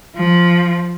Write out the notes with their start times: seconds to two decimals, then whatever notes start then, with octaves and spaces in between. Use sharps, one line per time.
0.16 F3